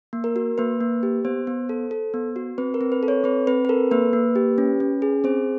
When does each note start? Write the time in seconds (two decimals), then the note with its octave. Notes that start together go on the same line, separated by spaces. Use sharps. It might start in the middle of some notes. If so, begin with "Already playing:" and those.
0.13 A#3
0.24 A#4
0.36 F#4
0.58 A#3 B4
0.81 A#3
1.03 G4
1.25 B3 C5
1.47 B3
1.69 A4
1.91 A4
2.14 B3
2.36 F#4
2.58 C4 B4
2.74 A#4
2.81 C4
2.92 B4
3.03 A4
3.08 C#5
3.24 C4 B4
3.47 C4 B4
3.65 B4
3.69 A4 A#4
3.91 A#3 B4
4.13 A#3
4.36 G4
4.58 C#4
4.80 C#4
5.02 G#4
5.24 C4 C5